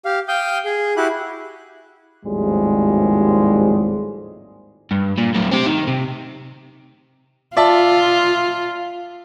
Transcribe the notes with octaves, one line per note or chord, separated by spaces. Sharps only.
G4 F5
F5 G5 D#6 G6
G#4
E4 F#4 G4 F#6
G#1 D#2 A2 F3 G3 G#3
G2
A#2
A2 F#3
C4 G4
D#3
C3
F4 D5 E5 A5